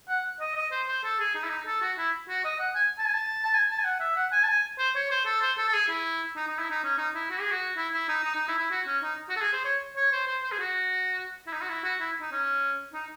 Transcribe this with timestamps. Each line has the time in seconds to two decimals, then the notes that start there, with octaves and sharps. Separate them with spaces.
0.09 F#5
0.40 D#5
0.56 D#5
0.72 C5
0.88 C5
1.04 A4
1.19 G#4
1.35 D#4
1.44 E4
1.50 D#4
1.66 A4
1.82 F#4
1.98 E4
2.29 F#4
2.44 D#5
2.59 F#5
2.75 G#5
2.99 A5
3.06 G#5
3.13 A5
3.45 A5
3.54 G#5
3.71 A5
3.79 G#5
3.85 F#5
4.00 E5
4.16 F#5
4.32 G#5
4.44 A5
4.48 G#5
4.79 C5
4.95 C#5
5.11 C5
5.26 A4
5.41 C5
5.58 A4
5.69 A4
5.74 G#4
5.89 E4
6.36 D#4
6.48 D#4
6.59 E4
6.71 D#4
6.83 C#4
6.98 D#4
7.15 E4
7.30 F#4
7.41 G#4
7.51 F#4
7.77 E4
7.93 E4
8.09 D#4
8.24 D#4
8.35 D#4
8.48 E4
8.59 E4
8.71 F#4
8.87 C#4
9.03 D#4
9.29 F#4
9.36 A4
9.41 G#4
9.53 C5
9.65 C#5
9.96 C#5
10.12 C5
10.27 C5
10.43 C5
10.52 G#4
10.59 F#4
11.47 E4
11.53 D#4
11.62 F#4
11.69 E4
11.84 F#4
12.00 E4
12.21 D#4
12.32 C#4
12.94 D#4